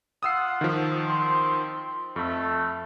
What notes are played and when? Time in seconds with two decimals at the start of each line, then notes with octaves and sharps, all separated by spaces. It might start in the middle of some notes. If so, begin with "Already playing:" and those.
0.23 F4 F#5 D#6 E6 C7
0.61 D#3 F3
1.05 C4 C6
2.16 F2 A3